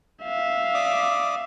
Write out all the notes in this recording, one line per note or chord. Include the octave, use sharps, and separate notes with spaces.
E5 F5
D5 D6 D#6